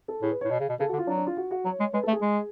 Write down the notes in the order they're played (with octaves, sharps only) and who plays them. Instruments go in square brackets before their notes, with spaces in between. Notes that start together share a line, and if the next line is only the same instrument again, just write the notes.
[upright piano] A4
[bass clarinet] A2 [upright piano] G#4
[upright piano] B4
C#5
[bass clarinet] A2
B2
C#3
B2
[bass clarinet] C#3 [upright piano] A4
[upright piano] F#4
[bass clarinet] D3
[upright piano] F4
[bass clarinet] F#3 [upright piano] D4
[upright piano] D4
F4
F#4
F#4
[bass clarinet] F#3 [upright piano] C#5
[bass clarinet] G#3
[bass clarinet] G#3 [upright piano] B4
[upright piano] A4
[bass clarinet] A3
[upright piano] G#4
[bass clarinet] G#3